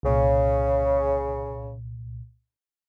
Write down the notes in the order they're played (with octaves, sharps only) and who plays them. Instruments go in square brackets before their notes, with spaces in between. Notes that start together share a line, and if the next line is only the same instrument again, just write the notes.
[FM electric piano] C2 A#2 [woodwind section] C#3